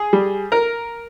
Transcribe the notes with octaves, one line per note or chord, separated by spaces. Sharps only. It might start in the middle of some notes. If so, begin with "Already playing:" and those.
Already playing: G#4
G3
A#4